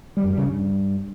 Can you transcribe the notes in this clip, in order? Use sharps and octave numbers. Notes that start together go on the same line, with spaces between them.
G3
F#2
G3
C#3
G2